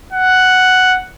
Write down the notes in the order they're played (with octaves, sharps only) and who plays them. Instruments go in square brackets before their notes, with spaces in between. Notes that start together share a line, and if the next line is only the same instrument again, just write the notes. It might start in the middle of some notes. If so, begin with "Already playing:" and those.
[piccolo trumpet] F#5